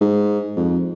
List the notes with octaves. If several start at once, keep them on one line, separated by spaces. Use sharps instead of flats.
G#2
F2